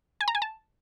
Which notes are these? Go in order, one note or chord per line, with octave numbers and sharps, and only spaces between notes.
G#5
A#5
G#5
A5